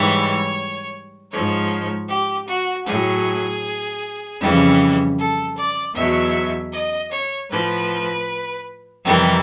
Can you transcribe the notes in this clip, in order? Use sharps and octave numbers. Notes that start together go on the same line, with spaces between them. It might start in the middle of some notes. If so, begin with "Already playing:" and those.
Already playing: G#2 E3 G3 C#5
G#2 F3 C#5
G4
F#4
A2 F#3 G#4
F2 C#3 E3 G3
A4
D5
E2 B2 F#3 E5
D#5
C#5
A2 F3 B4
F2 C3 E3 G3 A#4